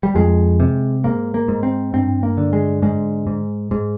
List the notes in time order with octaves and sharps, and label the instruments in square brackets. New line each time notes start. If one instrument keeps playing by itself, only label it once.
[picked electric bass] G3
F2 G#3
C3
G#2 A#3
A#3
G#2
C4
G2 C4
A#3
D3
G#3
G#2 G#3
G#2
G#2